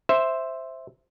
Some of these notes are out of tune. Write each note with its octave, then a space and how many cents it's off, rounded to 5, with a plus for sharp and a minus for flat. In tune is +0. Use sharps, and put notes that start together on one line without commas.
C5 +0 E5 +0